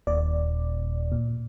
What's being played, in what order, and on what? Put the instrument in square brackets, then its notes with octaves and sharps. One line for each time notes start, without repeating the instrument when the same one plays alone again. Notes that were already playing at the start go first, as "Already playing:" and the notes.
[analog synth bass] D#1 [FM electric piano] D5
[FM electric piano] A#2